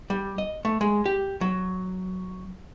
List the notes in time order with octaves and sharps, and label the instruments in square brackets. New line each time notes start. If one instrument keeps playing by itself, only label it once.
[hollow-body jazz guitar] G3
D#5
A3
G#3
G4
F#3